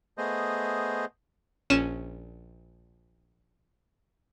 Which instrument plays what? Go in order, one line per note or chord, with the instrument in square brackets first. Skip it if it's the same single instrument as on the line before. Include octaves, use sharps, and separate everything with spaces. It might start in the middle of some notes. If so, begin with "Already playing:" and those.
[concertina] A3 B3 G#4 C5 D#5
[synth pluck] A#1 C#4 E7